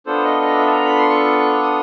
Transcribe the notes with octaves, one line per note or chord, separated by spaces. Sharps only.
B3 D4 F4 A4 C5
D#5
D#5
E5
A5
A#5
B5
C6
C#6
D#6